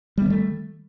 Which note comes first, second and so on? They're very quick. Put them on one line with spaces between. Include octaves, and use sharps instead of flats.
G3 B3 D#3 A3